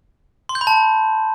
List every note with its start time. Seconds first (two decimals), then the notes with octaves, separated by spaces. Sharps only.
0.49 C6
0.55 G6
0.61 B5
0.67 A5